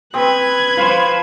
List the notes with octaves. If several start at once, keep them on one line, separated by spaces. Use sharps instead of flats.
C4 B4 G5 D#6 F#6 G#6
F4 C5 C#5 F5 B5